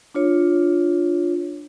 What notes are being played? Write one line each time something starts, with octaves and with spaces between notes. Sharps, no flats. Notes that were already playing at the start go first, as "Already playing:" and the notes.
D4 F4 C#5